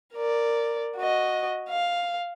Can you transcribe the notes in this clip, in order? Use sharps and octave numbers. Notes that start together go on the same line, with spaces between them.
A#4 D5
F#4 D#5
F5